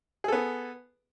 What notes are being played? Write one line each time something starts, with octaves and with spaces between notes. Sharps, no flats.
B3 G#4 A4